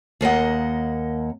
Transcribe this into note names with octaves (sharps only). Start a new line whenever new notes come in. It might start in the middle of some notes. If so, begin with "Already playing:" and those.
D#2 A#3 D#5 F#5